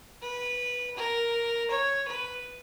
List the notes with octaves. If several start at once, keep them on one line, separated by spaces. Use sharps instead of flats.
B4
A#4
C#5
B4